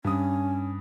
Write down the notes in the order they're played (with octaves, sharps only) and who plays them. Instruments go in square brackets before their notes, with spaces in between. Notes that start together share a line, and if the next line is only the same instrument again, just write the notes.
[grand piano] G2 D#6 [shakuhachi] C#4